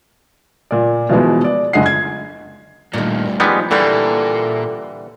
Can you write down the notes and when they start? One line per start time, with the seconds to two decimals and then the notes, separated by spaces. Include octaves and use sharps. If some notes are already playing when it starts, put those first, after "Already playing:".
0.71 A#2 D5
1.09 B2 E3 F3 G#3 B3
1.44 D5
1.73 F#1 D3 G#3 D#5 F#5 C7
1.86 G#6
2.93 D2 G2 A#2 D#3
3.40 F3 G3 G#3 B3 D#4
3.71 A#2 D3 E3 G3 A#3 A4 E5